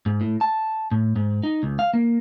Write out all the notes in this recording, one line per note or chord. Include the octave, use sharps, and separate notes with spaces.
G#2
A2
A5
A2
G#2
D#4
C#2
F5
A#3